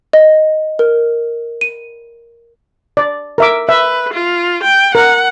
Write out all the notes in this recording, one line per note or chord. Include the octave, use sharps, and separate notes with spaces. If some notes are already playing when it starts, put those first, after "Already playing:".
D#5
A#4
D#7
D5
A#4 E5 D6
B4 E5
F4
G5
A#4 F#5